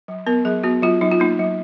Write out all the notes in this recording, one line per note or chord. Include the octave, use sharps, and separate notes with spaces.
F#3
B3 A#4
F#3 G#4
B3 F#4
F#3 F4
F#3 D#4
F4
A#3 D#4
F#3